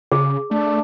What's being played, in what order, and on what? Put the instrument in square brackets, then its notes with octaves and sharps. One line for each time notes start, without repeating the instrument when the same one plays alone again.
[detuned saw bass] C#3 [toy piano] G#4
[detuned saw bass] A3 [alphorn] D4